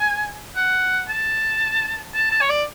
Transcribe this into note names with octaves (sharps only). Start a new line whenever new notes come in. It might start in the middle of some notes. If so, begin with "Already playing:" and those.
Already playing: G#5
F#5
A5
A5
A5
C#5
D5